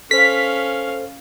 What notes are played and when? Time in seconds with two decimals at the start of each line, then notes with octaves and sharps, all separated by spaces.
0.11 C#4 A4 C5 F5 B6